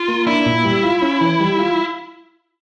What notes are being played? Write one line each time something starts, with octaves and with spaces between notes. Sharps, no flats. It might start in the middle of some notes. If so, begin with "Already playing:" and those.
Already playing: F4
A#3
D4 E4
A#2
G3
F4
C#4
E3
G3
F4